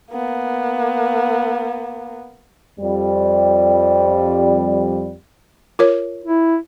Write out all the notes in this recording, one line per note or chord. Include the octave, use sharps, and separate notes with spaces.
A#3 B3
F2 G3
F4 A#4 C#5
E4